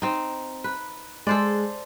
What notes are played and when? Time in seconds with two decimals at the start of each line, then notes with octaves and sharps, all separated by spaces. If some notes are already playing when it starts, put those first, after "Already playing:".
0.02 C4 D#4
0.64 B4
1.27 G#3 A4 C5 D5